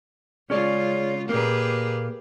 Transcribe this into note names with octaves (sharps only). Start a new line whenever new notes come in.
C#3 G#3 C#4 F4 G#4 D5
A#2 A#3 G4 G#4 B4